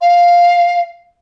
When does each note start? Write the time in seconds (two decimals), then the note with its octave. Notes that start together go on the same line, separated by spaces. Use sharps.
0.01 F5